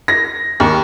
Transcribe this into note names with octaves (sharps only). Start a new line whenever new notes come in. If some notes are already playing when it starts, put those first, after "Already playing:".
A#6
D#2